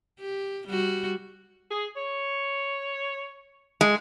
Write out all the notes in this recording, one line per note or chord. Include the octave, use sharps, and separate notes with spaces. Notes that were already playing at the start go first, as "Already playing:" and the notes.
G4
G3 F#4
G#4
C#5
G#3